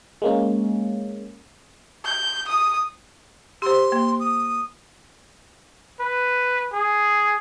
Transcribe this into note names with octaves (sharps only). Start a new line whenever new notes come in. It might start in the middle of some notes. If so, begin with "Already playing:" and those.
G#3 A#3 C#4
G6
D#6
G4 C5 C6
A#3
D#6
B4
G#4